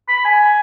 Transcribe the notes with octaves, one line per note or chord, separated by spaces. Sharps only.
B5
G#5